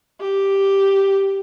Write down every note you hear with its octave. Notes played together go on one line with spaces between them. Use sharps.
G4